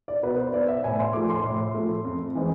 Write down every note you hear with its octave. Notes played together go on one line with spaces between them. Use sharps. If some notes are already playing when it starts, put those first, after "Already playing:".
D5
B2 B4
C5
B3 D5
E5
A2 G#5
C6
F3 A3 D6
C6
A2
F3 A3
F2
E3 G#3 C4